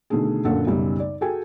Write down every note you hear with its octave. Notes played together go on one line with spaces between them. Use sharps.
B2 D3 D#3 A3 G#4
F#2 A#2 D3 A4 F#5
B1 F#2 C#3 G3
D5
F#4 G#4 A4 G5 G#5